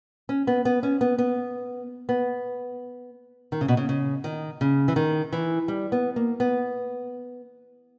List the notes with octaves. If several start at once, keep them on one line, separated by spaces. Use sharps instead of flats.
C#4
B3
B3
C#4
B3
B3
B3
D#3
C#3
B2
C#3
C#3
D#3
C#3
E3
D#3
E3
G3
B3
A#3
B3